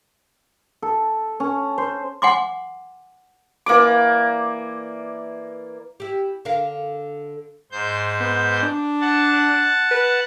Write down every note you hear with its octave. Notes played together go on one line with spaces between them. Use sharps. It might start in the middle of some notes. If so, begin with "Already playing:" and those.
A4
C#4
C5
F#5 G#5 C6 D6
E3 A#3 D5 D6
E4 G4
D3 A#4 F5
G#2 C5 G6
B3
D4
F#5 A5
B4